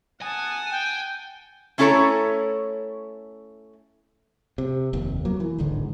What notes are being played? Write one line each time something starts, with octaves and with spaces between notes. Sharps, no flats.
F#5 G#5 A5 D#6
G5
A3 C#4 E4 A4 C#5 A#5
C3
F1 D#2
F#3 A#3
E3
D1 G#1 G#2 D3